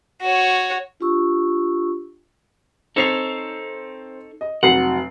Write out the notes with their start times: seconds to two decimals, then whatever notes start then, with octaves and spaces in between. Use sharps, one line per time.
0.22 F#4 C#5
1.00 D4 F4 G4 C#6 E6
2.96 C4 D#4 A4 C#5 C7 F7
4.41 D#5
4.63 F1 F#3 F#5 C7